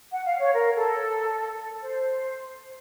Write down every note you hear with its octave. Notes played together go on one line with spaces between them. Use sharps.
F#5
F5
C#5
A#4
A4
C5